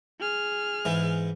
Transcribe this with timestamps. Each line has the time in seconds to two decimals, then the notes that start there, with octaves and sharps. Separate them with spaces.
0.19 G#4 F6
0.85 G#2 E3